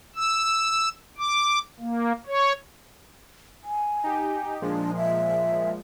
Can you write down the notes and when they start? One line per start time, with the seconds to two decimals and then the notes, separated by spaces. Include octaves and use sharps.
0.16 E6
1.18 D6
1.80 A#3
2.27 C#5
3.64 G#5
4.04 D#4 G4
4.61 A#2 F3 G#3 D4
4.97 E5